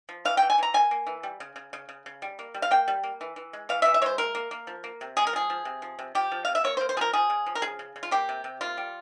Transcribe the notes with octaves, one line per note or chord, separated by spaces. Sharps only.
F3
E3 F5
E3 G5
G#5
E3 A#5
A#3 G#5
A#3
E3
G3
C#3
C#3
C#3
C#3
C#3
G3
A#3
G3
F5
A#3 G5
G3
A#3
E3
E3
G#3
E3 F5
E5
E3
E5
G#3 C5 C#5
A#3 A#4
A#3
A#3
F3
A#3
C3
G#3 G#4
A#4
F3 G#4
F3
C3
F3
C3
F3 G4
F3
C3 F5
E5
A#3 C#5
C5
A#3
C5
F3 G#4 A#4
F3 G#4
C#3
F3
A#4
C#3 G#4
C#3
C#3
F4
A#3 G4
C3
C3
A#3 F4
G3